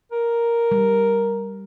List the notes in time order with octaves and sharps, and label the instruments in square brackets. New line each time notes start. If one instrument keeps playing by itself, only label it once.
[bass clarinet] A#4
[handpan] G3